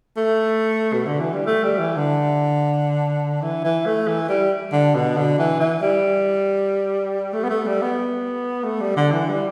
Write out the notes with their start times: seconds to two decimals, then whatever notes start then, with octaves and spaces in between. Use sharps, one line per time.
0.17 A3
0.94 B2
1.07 D3
1.20 E3
1.34 G3
1.47 A3
1.64 G3
1.79 E3
1.97 D3
3.42 E3
3.65 E3
3.87 A3
4.08 E3
4.29 G3
4.73 D3
4.95 B2
5.17 D3
5.39 E3
5.60 E3
5.82 G3
7.34 A3
7.44 B3
7.50 A3
7.67 G3
7.82 B3
8.65 A3
8.81 G3
8.97 D3
9.13 E3
9.30 G3